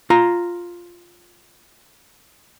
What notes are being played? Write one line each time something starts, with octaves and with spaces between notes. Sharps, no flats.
F4 A#5